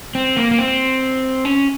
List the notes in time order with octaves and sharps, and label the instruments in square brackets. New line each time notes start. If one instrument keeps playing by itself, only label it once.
[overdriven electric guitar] C4
A#3
A#3
C4
C#4